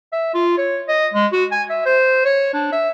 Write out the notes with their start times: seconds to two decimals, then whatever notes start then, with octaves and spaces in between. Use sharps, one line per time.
0.12 E5
0.34 F4
0.58 C#5
0.88 D#5
1.13 G#3
1.33 F#4
1.51 G#5
1.70 E5
1.85 C5
2.25 C#5
2.54 D4
2.72 E5